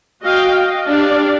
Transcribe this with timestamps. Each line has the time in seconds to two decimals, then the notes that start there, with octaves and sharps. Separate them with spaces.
0.21 F#4 D#5 F5 G5
0.59 D#5
0.88 D4 G4 D5 F5